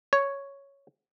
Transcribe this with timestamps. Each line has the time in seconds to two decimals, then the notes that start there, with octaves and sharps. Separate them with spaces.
0.13 C#5